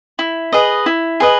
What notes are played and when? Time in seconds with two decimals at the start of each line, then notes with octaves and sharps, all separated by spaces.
0.19 E4
0.52 G#4 B4 D#5
0.86 E4
1.20 G#4 B4 D#5